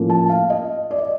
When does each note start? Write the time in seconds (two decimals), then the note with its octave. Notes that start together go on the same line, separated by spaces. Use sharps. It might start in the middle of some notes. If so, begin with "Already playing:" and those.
Already playing: A2 F3 A#3 C#4
0.10 A5
0.29 F5
0.50 D#5
0.91 D5
0.98 D#5